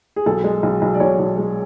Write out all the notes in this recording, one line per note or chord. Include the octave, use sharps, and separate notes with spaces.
G#4
B1 A4
G#3
B1
B1
D5
B1 C#5
B1
G#3